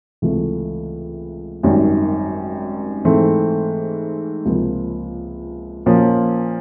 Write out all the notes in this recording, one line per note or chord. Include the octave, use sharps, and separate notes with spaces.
C#2 C3 E3 A3
G#1 F#2 D#3 G3
G#2 E3 A3 C4
C#2 C3 F3 A#3
A#2 F3 A#3 C#4